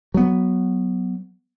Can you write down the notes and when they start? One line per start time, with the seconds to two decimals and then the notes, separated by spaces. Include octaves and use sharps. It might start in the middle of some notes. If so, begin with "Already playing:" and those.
0.14 F#3 B3